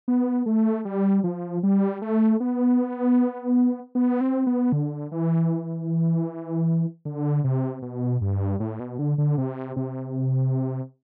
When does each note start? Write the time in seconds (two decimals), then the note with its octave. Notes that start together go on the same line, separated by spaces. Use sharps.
0.08 B3
0.46 A3
0.85 G3
1.24 F3
1.63 G3
2.02 A3
2.40 B3
3.95 B3
4.21 C4
4.47 B3
4.72 D3
5.12 E3
7.05 D3
7.44 C3
7.82 B2
8.21 G2
8.60 A2
8.80 B2
8.99 D3
9.18 D3
9.38 C3
9.76 C3